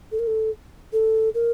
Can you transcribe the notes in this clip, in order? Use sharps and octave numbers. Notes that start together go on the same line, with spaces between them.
A4
A#4
A4
A4
A#4